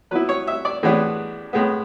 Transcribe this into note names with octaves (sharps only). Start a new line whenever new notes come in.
F#3 B3 E4 B4
C#5
E5
D5
A2 E3 G#3 B3 D4
A2 G#3 B3